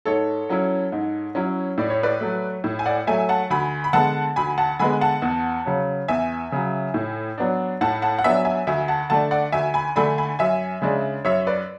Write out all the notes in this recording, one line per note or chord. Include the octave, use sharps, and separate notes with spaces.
G#2 A4 C#5
F#3 C#4 E4
G#2
F#3 C#4 E4
A2 D5
C#5
B4 D5
F#3 A3
A2
G#5
D5 F#5
F#3 A3 E5 G#5
F#5 A5
D2 G#5 B5
B5
D3 G#3 B3 F#5 A5
D2 G#5 B5
F#5 A5
D3 G#3 B3 G#5 B5
F#5 A5
E2
C#3 F#3
E2 E5 G#5
C#3 F#3
A2
F#3 B3 D4
A2 F#5 A5
F#5 A5
F#5
F#3 B3 D4 E5 G#5
E5 G#5
D2 E5 G#5
F#5 A5
D3 A3 D4 F#5 A5
D5 F#5
D2 E5 G#5
G#5 B5
D3 A3 D4 G#5 B5
G#5 B5
F#2 E5 G#5
C#3 G#3 D4
F#2 C#5 E5
B4 D5